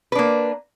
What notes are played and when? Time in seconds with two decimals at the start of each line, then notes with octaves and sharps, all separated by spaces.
0.12 B4
0.15 D4
0.19 A#3